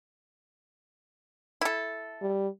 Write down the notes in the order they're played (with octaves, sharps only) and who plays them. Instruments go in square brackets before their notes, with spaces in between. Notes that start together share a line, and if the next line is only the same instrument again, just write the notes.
[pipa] E4 A4
[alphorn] G3